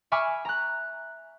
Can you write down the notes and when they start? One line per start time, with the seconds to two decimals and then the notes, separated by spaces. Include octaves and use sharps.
0.12 E5 G#5 B5 C#6 D6 F6
0.45 A#5 F#6